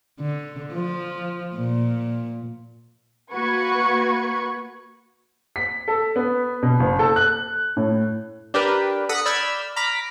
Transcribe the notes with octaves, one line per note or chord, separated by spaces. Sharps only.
D3
F3
A#2
A#3 F#4 B4 C#6 G#6
B6
A4
B3
B2
F#1
A4
F#6
A2
D4 G4 A#4 B4
A4 F#5 D#6 A#6 B6 C#7
D5 B5 E6 F6 G6 G#6
A#5 B5 D6 F6 B6